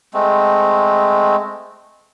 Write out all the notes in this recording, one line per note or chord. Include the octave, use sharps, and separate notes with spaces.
G#3 A3 C4